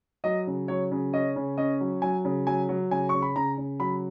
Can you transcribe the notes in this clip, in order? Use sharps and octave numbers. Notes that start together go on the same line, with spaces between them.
F#3 D#5
C#3
F#3 C#5
C#3
C#4 D#5
C#3
C#4 D#5
F#3
F#3 G#5
C#3
F#3 G#5
F#3
C#3 G#5
C#3 C#6
B5
C#3 A#5
C#3
F#3 B5